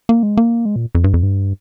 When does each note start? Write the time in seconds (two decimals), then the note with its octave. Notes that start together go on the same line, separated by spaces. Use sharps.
0.09 A#3
0.23 G#3
0.37 A#3
0.65 G#3
0.76 A#2
0.95 F2
1.04 G2
1.14 F2
1.23 G2